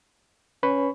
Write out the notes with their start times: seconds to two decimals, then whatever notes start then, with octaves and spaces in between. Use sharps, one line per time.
0.63 C#4 B4 B5 C#6